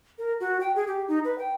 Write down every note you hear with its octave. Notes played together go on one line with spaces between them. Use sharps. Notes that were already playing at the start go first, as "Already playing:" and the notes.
A#4
F#4
G5
G#4
G4
D#4
B4
G5